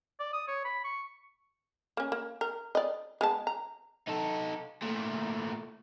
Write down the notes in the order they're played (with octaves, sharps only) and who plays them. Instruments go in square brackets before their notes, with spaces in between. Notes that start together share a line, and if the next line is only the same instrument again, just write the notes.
[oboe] D5
D#6
C#5
B5
C#6
[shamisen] A#3 C#4
A#3
A#4
D5 D#5
G#3 B3 A5
A#5
[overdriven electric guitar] D#4 A4
A#2 A3